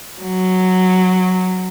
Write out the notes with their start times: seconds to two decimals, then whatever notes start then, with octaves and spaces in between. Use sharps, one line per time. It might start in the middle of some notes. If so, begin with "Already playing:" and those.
0.22 F#3